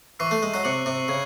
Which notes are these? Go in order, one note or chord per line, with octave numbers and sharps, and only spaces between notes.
E3 C#6 E6 C7
A3
G#3
F#3
C3 C#6 F#6 C#7 F#7
C3
C#3 G#6